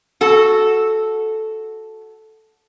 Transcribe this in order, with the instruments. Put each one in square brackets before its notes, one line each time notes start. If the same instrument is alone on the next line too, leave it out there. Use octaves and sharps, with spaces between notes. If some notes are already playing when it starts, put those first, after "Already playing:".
[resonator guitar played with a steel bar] F#4 A4